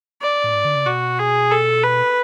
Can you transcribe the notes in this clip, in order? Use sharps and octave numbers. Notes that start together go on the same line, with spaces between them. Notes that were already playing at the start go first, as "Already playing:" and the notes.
D5
A2
G#2
D3
C#3
B2 F#4
G#4
A4
B4